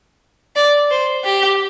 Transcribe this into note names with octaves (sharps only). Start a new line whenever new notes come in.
D5
C5
G4